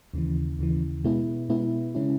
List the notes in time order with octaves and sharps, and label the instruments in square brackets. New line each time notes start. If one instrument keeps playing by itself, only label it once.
[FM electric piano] D#2 C#3 E3
D#2 C#3 E3
B2 G#3 B3 E4
B2 G#3 B3 E4
C#3 G#3 C#4 E4